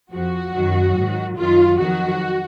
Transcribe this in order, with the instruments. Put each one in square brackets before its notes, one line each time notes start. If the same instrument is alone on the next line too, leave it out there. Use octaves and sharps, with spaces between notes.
[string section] F2 F3 F#4
F#2 D#3 F#3
G#2 D#3 F#3
F#2 D#3 F#3 F4
F2 D#3 F#3 F#4